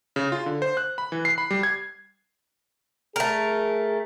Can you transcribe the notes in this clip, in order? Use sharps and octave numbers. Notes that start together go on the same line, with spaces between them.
C#3
F4
D3
C5
F#6
B5
E3
C7
B5
G3
G#6
A3 G#4 A#4